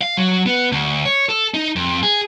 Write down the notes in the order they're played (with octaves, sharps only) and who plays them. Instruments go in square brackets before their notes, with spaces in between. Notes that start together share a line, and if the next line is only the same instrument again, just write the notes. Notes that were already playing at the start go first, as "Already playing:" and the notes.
[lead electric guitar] F5
F#3
B3
D2
C#5
A4
D#4
F2
G#4